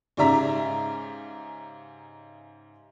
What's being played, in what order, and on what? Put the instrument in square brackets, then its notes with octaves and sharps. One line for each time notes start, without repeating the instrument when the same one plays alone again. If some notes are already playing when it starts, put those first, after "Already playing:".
[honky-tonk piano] G#2 C#3 G4 D5 E5 A#5